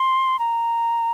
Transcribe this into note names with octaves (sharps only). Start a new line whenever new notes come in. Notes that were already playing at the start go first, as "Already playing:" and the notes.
Already playing: C6
A#5